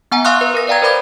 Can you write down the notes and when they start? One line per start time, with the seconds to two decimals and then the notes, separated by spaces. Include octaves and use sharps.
0.12 B3 F#5 G#5 A#5
0.25 F5 C6 C#6 D#6 F6 F#6
0.41 B4
0.54 A#4 B4 A#6
0.67 B4 D5 F5 G5 A#5 G#6
0.82 A#4 C5 D5 B5 D6 G#6